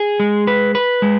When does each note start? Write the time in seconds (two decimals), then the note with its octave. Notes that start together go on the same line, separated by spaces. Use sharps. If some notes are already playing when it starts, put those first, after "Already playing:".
Already playing: G#4
0.20 G#3
0.47 B4
0.75 B4
1.02 G#3